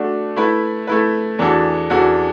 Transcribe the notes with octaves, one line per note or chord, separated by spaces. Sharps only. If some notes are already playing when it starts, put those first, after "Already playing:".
Already playing: A3 D4 F#4
A3 E4 B4
A3 E4 B4
E2 E3 D4 F#4 A4
E2 E3 D4 F#4 A4